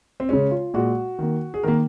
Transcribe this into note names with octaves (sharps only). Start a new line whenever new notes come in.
C4
C#3 G#3 C#4
F4
A#2 G#3 F#4
D#3 A#3
G#4
D#3 A#3 A#4